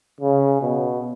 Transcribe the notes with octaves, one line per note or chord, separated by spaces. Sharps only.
C#3
B2